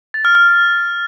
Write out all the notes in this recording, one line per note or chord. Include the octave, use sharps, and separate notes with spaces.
A6
F6
F6